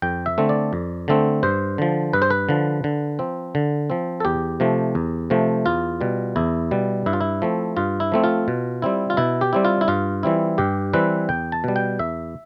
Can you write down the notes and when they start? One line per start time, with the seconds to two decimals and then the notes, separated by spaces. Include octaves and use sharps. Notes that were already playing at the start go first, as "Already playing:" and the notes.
0.02 F2 G5
0.26 E5
0.38 D3 A3 C4
0.49 D5
0.73 F2
1.08 D3 A3 C4
1.43 G2 C5
1.78 D3 F3
2.13 G2 B4
2.22 C5
2.30 B4
2.49 D3 F3
2.84 D3
3.19 F3 C4
3.55 D3
3.90 F3 C4
4.20 A4
4.25 E2 G4
4.60 C3 F3 A3
4.95 E2
5.30 C3 F3 A3
5.66 E2 F4
6.01 B2 G3
6.36 E2 E4
6.71 B2 G3
7.06 G2 E4
7.13 F4
7.21 E4
7.42 F3 A3 C4
7.77 G2 F4
8.00 E4
8.12 F3 A3 C4
8.24 F4
8.48 B2
8.82 G3 C4 E4
9.10 F4
9.17 B2 E4
9.41 G4
9.53 G3 C4 E4
9.65 F4
9.81 E4
9.88 G2 F4
10.23 E3 G3 C4 E4
10.58 G2 G4
10.93 E3 G3 C4 E4 B4
11.29 E2 G5
11.52 A5
11.64 B2 G3
11.76 G5
11.99 E2 E5